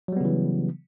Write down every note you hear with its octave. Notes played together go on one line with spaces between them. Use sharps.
C#3 E3 F#3 G3 B3